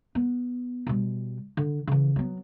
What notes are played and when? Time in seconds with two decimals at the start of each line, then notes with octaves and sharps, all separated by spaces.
0.15 B3
0.87 B2 G3
1.57 D3
1.87 C#3 E3
2.16 F#3 B3